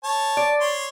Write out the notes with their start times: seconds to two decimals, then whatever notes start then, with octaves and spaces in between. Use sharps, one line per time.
0.04 C#5 A5
0.37 D5
0.60 C#5 C6